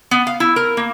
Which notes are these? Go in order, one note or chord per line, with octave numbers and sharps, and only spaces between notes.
B3
F5
E4
A#4
A#3